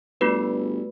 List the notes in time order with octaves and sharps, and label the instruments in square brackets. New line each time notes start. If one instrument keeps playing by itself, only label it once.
[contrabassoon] G1 [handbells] A3 F#4 B4